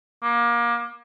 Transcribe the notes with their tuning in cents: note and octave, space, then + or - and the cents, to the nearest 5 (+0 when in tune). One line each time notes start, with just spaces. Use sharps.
A#3 +25